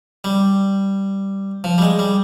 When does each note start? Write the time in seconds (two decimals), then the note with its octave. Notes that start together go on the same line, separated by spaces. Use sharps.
0.24 G3
1.64 F3
1.78 G3
1.82 G#3
1.99 G3